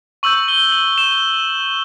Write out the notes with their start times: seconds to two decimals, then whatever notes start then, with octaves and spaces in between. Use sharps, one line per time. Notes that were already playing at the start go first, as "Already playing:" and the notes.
0.23 C#6 E6 G6 F#7
0.48 G7
0.72 F#7
0.98 E7